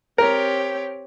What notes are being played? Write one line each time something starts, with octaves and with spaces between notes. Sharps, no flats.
C4 G4 A#4 C#5